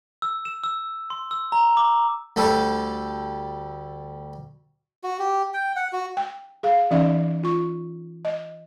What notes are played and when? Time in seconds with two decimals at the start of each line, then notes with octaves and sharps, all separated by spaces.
0.22 E6
0.45 E7
0.64 E6
1.10 C6
1.31 E6
1.52 A#5
1.77 D6
2.36 D2 G3 G4 A4
5.04 F#4
5.19 G4
5.54 G5
5.76 F#5
5.93 F#4
6.17 G5
6.63 G#4 F5
6.91 E3 C#4 D#4 D5 E5
7.43 F4 C#6
8.25 D#5